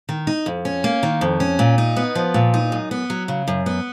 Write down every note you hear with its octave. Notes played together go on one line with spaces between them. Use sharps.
D#3
D#4
F2
C#4
A#3
D#3
F2
C#4
A#2
D#4
B3
F3
A#2
D#4
F#2
B3
F#3
C#3
F#2
B3